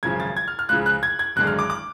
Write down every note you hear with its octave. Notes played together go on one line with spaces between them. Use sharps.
G#1 F#2 C#3 F3 G#6
A6
G#6
F6
F6
C#2 C#3 F3 F#6
F#6
G#6
G#6
G#1 F#2 D3 G#3 D4 F#6
F6
D6
D6